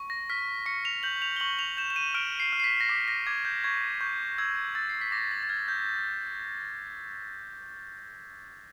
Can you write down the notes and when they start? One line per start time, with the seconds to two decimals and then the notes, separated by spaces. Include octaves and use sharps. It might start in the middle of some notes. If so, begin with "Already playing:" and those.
Already playing: C#6
0.10 A#6
0.30 F6 B6
0.66 C#6 C#7
0.85 F7
1.03 G6 F#7
1.22 F7
1.36 G7
1.40 C#6 F#7
1.59 F7
1.77 G6 E7
1.90 E7
1.96 D#7
2.14 F6 D7
2.40 C7
2.53 F6
2.60 C7
2.64 B6
2.80 A#6
2.89 D6 B6
3.08 A#6
3.27 D6 G#6
3.45 G6
3.64 C#6 G#6
4.01 C#6 G6
4.38 E6 G#6
4.75 E6 A6
4.89 C7
5.01 B6
5.12 D6 A#6
5.31 A6
5.43 A6
5.49 F6 G#6
5.68 G6